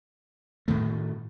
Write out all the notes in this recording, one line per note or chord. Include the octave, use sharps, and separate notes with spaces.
A2 D#3 A3